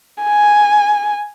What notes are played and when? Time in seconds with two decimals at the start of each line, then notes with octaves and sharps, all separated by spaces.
0.24 G#5